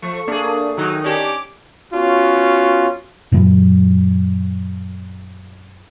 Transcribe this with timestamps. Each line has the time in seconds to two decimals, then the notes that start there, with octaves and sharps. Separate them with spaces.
0.02 F3 A3 C#6
0.27 A3 A#3 D4 G#4
0.78 D#3 F#3 D#4
1.05 C#4 D4 G4
1.22 D6
1.93 B3 C#4 F4 F#4
3.32 F#2 A#2 E3 F#3